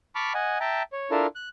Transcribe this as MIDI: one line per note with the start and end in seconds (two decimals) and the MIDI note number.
0.15 0.33 81
0.15 0.33 83
0.15 0.33 85
0.15 0.33 86
0.15 0.33 89
0.34 0.58 75
0.34 0.58 78
0.34 0.58 80
0.60 0.83 76
0.60 0.83 79
0.60 0.83 81
0.60 0.83 82
0.93 1.11 73
1.11 1.27 62
1.11 1.27 64
1.11 1.27 65
1.11 1.27 69
1.11 1.27 70
1.35 1.49 90